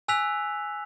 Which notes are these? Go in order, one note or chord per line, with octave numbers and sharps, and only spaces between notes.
G#5 E6 F#6 B6 F7